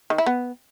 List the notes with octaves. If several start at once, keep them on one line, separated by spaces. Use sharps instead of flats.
D#3
E4
B3